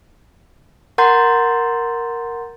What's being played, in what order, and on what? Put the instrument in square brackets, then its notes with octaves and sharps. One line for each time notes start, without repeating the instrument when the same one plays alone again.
[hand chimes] A#4 F#5 A#5 C6 G6 A6